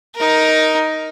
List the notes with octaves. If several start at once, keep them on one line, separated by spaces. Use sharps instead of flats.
D#4 A#4